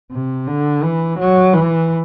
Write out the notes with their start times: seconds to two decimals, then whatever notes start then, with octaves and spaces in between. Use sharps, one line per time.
0.12 C3
0.48 D3
0.83 E3
1.19 F#3
1.54 E3